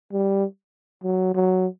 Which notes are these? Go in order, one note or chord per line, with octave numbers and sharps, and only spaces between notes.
G3
F#3
F#3